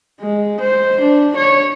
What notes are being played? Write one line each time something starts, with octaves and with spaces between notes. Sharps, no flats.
G#3
C5
D4
C#5